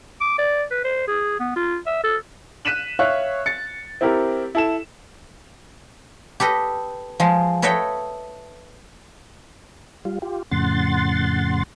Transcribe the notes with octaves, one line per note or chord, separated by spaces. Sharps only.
D6
D5
B4
C5
G#4
B3
F4
E5
A4
F#6 B6 D#7 E7 F#7
C#5 E5 F5 F#6
A6 C#7
C4 E4 G4 A#4
E4 A4 E7
G4 A4 B4 D#5
F3 G#3
A4 B4 C#5 D#5 E5 G5
G3 F4
F4 G4
F2 A2 C#3 F#5 C6 A6